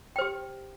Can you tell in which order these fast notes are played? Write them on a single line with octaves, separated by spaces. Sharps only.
G5 C5 G4